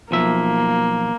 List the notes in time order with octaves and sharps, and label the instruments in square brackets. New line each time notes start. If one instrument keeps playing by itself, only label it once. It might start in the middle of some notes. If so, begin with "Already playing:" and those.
[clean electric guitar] B1 F3 E5 [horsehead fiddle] A#3